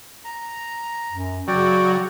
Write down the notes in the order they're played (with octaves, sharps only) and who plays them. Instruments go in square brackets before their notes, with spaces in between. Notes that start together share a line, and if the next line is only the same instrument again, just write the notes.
[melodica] A#5
[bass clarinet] F#2
[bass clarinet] C#3 [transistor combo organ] F#3 [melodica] F#4 D5 G5